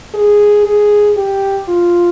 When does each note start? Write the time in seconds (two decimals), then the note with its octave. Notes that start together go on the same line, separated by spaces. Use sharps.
0.14 G#4
0.65 G#4
1.16 G4
1.68 F4